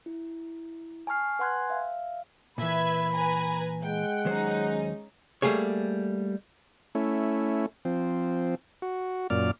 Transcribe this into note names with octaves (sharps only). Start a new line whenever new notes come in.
E4
G#5 A5 C#6 F6 C7
B4 F#5 G#5 C6 F#6 G#6
E5 F5
A#2 E3 B4 E5 B5 G#6
B4 G#5 A#5
G#3 F#5 G5
D#2 F#3 C#4 D#4 C5
G3 A3 A#3 G#4 C#5
A3 C#4 E4
F3 C4
F#4
F#2 A#2 D5 F6